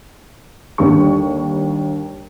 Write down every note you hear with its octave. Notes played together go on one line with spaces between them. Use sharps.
D#2 D3 G3 C#6